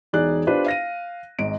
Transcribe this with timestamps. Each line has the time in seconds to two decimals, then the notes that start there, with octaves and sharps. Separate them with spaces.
0.13 E1 D#4 G#4 D5 F#6
0.47 D4 F4 G4 B4 C5 D5
0.66 F5 A#6 D#7
1.39 G#1 G#2 D7